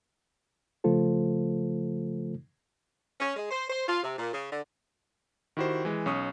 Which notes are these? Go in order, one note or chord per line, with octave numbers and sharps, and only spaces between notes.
C#3 F3 A3 F4 A4 C5
C#4
G#3
C5
C5
F4
C3
A#2
C#3
D3
D#3 E4 F#4 G4 C5
E3 G#3
B1 C#4 C#6 D#6